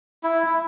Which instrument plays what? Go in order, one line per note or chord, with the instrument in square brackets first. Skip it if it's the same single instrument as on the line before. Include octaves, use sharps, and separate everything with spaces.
[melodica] E4
E4